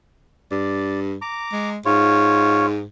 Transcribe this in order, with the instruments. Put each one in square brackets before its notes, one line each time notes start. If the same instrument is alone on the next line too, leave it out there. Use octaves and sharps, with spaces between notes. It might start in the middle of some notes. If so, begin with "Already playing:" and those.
[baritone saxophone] G2 [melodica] D5
[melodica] A#5 D6
[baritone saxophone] G#3
[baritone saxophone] G#2 [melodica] F4 C#5